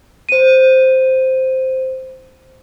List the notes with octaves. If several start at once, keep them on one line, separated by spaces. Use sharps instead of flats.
C5 D#7